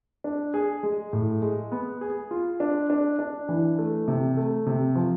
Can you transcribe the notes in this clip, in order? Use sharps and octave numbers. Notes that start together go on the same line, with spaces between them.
D4
G#4
G#3
A2
G#3
B3
G#4
F4
D4
D4
D4
E3
A3
C3
A3
C3
F3